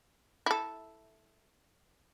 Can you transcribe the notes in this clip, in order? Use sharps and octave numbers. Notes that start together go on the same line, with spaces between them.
E4 A4